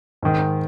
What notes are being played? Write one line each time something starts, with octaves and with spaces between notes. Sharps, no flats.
G#2 D#3